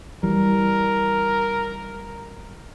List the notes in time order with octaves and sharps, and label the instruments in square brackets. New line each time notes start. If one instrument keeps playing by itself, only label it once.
[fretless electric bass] E3 G3 [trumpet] A#4